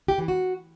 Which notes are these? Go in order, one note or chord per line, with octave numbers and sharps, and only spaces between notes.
G4
E3
F#4